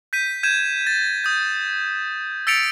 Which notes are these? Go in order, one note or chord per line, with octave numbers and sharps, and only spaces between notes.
G6 B6 D#7
G6 G#6 D#7 E7
A6
D#6 G6
E6 A6 B6 C#7 D7 F7